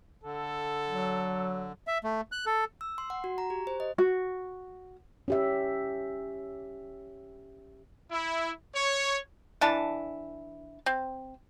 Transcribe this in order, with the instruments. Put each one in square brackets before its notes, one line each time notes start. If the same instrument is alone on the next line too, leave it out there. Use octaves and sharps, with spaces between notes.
[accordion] D3 [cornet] A4
[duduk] F#3
[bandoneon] E5
A3
F#6
A4
[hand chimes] E6
C6
F#5
F#4
A#5
G4
C5
D#5
[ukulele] F#4
[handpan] C#4 G4 E5
[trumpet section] E4
C#5
[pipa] E3 D4 A5
C4